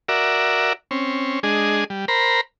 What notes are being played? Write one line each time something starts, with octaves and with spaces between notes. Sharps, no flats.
F#4 A#4 D5 E5
C4 C#4
G#3 D4 G#4 D#5
G3
A#4 C5 A#5 B5